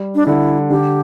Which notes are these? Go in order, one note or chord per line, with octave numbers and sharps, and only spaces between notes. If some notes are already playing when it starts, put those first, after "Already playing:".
Already playing: G3
D4
D3 E4
D3 G4